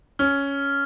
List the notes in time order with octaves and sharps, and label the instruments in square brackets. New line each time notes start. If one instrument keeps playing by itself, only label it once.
[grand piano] C#4 [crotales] F6